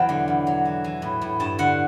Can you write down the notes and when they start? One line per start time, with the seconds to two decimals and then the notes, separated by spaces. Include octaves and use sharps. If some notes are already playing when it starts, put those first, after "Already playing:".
Already playing: E2 B2 F#3 G5 A5
0.09 D3
0.28 E2
0.47 F#3
0.65 E3
0.84 E3
1.02 A2
1.22 A2
1.40 G2 A5
1.59 D3 F#5